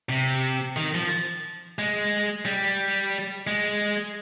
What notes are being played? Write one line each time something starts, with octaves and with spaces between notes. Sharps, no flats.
C3
D#3
F3
G#3
G3
G#3